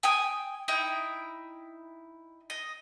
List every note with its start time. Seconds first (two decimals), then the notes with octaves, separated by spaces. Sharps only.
0.03 G5 G#5 D#6
0.68 D#4 E4 G5
2.50 D#5